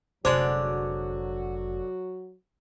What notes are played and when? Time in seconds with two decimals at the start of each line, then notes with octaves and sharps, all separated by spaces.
0.25 F1 D3 F#3 G#3 F#4 C5 D5 D6